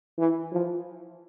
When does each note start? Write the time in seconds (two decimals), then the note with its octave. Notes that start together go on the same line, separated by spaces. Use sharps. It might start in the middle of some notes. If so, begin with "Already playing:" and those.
0.18 E3
0.52 F3